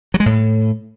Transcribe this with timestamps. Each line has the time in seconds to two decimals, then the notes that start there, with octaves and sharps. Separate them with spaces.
0.14 F#3
0.20 G#3
0.26 A2